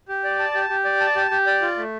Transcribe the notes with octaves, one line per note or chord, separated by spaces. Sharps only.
G4
D5
A5
G4
G4
D5
A5
G4
G4
D5
F4
A3